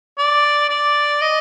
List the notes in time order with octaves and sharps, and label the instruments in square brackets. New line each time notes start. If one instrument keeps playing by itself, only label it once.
[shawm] D5
D5
D#5